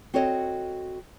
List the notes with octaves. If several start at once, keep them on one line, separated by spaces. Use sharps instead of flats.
C4 F#4 A4 C#5 D#5